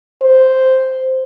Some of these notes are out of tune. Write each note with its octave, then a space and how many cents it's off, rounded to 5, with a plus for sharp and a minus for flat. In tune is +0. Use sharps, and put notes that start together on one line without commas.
C5 -5